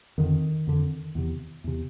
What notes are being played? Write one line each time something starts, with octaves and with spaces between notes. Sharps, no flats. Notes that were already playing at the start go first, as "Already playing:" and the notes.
F2 D3 D#3
F2 D3
E2 C3
E2 C3